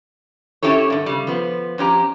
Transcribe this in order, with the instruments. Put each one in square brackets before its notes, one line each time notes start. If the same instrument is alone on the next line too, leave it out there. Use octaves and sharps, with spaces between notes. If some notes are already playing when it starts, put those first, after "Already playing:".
[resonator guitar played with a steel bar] C#4 E4 G4 A4 C#5
G2 D3
C#3 G3
F3 B3
F2 C#4 G4 A#5